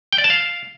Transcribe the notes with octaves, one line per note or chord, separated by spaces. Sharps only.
G5
D5
A5
F5